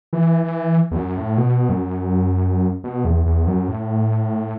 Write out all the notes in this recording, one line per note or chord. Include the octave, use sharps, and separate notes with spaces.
E3
E3
E2
F#2
A2
B2
F#2
B2
E2
E2
F#2
A2